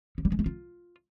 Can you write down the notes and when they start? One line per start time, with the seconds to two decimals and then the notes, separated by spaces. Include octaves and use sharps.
0.18 F3
0.25 G3
0.32 G#3
0.39 A3
0.46 F4